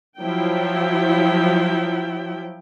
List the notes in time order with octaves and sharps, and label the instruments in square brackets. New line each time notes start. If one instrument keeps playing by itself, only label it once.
[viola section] F3 F#3 E4 G5